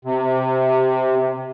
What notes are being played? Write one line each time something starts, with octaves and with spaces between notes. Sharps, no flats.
C3